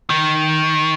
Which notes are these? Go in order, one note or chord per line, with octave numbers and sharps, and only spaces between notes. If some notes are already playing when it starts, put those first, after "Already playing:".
D#3